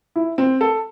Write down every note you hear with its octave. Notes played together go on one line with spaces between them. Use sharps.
E4
C4
A4